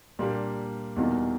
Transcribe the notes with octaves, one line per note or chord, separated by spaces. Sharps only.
A#2 G3 A#3 D4 G4
E2 B2 G3 A#3 D#4